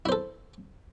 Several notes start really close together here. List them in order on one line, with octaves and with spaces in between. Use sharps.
E4 C5 A4